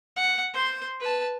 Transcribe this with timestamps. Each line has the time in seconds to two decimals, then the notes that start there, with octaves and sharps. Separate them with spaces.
0.16 F#5
0.53 C5 C6
1.00 B4 A5